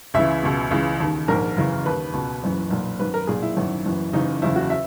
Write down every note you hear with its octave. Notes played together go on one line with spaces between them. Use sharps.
C#2 C#3 E3 E5
C#2 B2
C#2 C#3 E3
D#2 D#3
A#1 G#2 D#3 A#4
F#1 F#2 C#3 E3
D#2 D#3 B4
C#2 B2
F#1 F#2 E3
B1 A#2
G#1 F#2 D#3 B4
A#4
B1 A#2 G#4
E4
G#1 F#2 D#3
F#1 F#2 E3
F#1 F#2 C#3 E3 D#4
F#1 E2 C#3 E4
F#4
E5